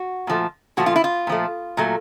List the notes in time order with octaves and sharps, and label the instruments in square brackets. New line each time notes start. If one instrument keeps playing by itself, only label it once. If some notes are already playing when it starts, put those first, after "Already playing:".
Already playing: [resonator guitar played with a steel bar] F#4
A#2 F3 A3
A#2 F3 A3 F#4
F4
E4
F4
A#2 F3 A3
A#2 F#3 A3